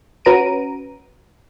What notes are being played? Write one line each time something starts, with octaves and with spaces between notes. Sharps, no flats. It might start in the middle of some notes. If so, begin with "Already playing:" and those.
C#4 F#4 B4 A#5 D7 D#7